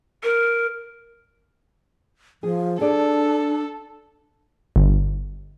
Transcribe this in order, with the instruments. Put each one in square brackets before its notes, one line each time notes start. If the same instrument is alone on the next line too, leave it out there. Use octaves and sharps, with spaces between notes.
[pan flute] A#4
[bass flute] F3 [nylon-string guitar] G#4
[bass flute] D4 [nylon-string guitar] G#4 D5 [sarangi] A4
[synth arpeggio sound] G1